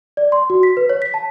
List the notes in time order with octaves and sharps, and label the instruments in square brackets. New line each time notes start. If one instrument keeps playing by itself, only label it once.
[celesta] D5
C6
F#4
B6
B4
C#5
B6
A5